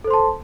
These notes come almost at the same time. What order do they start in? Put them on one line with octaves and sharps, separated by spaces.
A4 C5 C6 A5